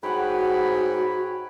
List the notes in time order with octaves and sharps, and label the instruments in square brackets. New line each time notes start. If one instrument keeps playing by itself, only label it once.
[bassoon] G#2 [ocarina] F#4 [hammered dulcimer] B4 F#5 [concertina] C#5 G5 B5